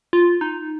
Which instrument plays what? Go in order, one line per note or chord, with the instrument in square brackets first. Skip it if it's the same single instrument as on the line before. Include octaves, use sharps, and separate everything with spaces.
[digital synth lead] F4
D#4